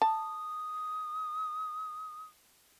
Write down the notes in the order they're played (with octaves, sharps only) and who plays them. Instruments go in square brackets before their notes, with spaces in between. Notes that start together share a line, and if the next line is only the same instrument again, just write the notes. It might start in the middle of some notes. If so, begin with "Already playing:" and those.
[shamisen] A5 [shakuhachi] D#6